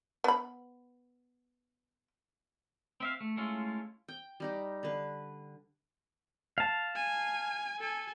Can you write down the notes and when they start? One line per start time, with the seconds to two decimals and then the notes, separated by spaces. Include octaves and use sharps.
0.24 B3 B5
3.00 C4 E5 F5
3.21 A3
3.37 G#3 A3 C#4 E4 F4
4.08 G5
4.40 G3 D#4 G4
4.83 D3 B4
6.58 F5 A5
6.96 G#5
7.79 A4 G#5